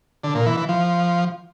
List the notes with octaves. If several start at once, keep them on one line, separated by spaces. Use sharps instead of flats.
D3
A#2
E3
E3
F3